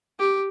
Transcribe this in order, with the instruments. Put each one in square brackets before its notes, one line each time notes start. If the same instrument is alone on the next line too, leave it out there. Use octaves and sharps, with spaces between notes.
[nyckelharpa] G4